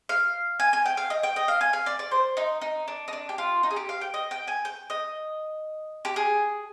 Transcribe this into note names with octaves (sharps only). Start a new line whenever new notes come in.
F5
G#5
G#5
G5
F5
D#5
G5
D#5
F5
G#5
F5
D5
D5
C5
D#4
D#4
D4
D#4
D4
G4
F4
D#4
G#4
G4
F5
G5
D#5
G5
G#5
G5
D#5
G4
G#4